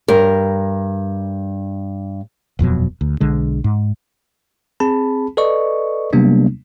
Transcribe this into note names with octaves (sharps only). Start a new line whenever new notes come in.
G2 A#4
D#1 F2 B2 F#3
D2
B1 D3 G#3
G#2
C4 G#4 A5 B5
A4 B4 D5 D#5 C#6
C3 F#3 G3 A#3 B3 D4